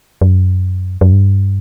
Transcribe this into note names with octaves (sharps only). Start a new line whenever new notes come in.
F#2
F#2
G2